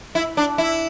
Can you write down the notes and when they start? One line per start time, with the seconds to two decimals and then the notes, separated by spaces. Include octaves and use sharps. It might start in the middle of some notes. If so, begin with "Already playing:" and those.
0.15 E4
0.37 D4
0.58 E4